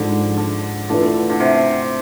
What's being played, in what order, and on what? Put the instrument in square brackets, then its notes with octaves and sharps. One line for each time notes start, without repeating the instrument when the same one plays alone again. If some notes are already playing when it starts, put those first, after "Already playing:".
Already playing: [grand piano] G#2 F3 G#3 D4 A4 [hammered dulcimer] D3
[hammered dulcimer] D3
[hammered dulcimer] D3 [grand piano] E3 A3 D4 F4 B4
[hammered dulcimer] D3
C3